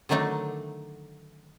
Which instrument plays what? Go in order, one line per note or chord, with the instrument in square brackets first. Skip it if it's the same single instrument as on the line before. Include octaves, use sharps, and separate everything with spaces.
[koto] D3 D#3 F#3 A3 D4 D#4